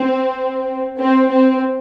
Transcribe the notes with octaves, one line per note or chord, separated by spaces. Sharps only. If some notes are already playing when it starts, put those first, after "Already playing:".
Already playing: C4
C4
C4